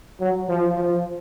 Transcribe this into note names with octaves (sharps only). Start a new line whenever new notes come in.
F#3
F3
F3